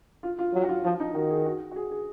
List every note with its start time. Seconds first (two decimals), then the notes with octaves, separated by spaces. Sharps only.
0.23 F4
0.39 F4
0.54 F#3
0.64 F#4
0.69 F4
0.84 F3 F4
1.00 D#4
1.14 D#3 F#4
1.30 G#4
1.45 F#4
1.71 F#4
1.76 G#4
1.91 G#4